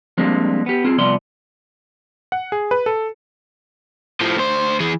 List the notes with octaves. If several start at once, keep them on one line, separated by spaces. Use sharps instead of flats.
F3 G3 G#3 A#3 C4 D4
B3 G4
C4 F4 G#4
C2 F3 B3 D5 C6
F#5
G#4
B4
A4
A2 F3
D2 C5
E3 G#4